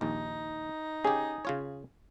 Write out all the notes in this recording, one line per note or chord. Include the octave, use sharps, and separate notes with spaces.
A#1 D#2 D#4
C#4 G4 G#4
C#3 F4 C#5